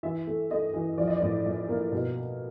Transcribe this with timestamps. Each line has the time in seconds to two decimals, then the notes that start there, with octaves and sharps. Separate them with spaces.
0.03 E3 E5
0.27 A3
0.50 A3 D#5
0.74 E3
0.98 F3 D5
1.07 D#5
1.17 D5
1.22 A2
1.46 A#1
1.69 A#3
1.92 B2